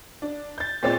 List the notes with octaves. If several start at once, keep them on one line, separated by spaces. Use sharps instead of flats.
D4
G6 A6
A#2 G#3 C4 C#5 D5 A6